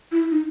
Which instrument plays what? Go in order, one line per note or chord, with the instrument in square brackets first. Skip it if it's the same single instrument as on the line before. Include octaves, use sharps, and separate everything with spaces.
[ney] E4
D#4